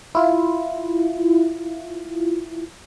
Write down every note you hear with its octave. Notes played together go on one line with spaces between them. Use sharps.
E4 F4